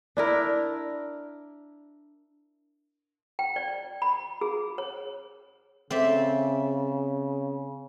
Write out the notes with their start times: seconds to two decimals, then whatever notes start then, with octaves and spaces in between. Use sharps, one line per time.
0.17 D4 E4 A#4
3.39 G5
3.56 D5
4.02 B5
4.41 G#4
4.78 C#5
5.90 C#3 C4 D5 E5